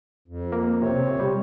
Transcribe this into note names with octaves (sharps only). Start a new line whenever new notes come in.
F2
A#3
C3 C4 C#5
C3
G3